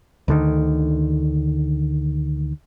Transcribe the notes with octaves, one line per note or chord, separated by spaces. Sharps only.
D2 D3 D#3